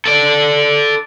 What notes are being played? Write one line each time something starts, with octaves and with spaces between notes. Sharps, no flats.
A4 D5